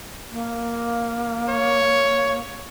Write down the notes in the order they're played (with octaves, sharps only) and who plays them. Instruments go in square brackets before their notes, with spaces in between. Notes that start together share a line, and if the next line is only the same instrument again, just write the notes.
[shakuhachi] A#3
[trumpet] C#5